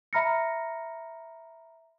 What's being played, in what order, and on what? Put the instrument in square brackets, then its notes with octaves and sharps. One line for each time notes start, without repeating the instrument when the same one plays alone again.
[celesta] E5 A#5 B5 F6 A#6 C#7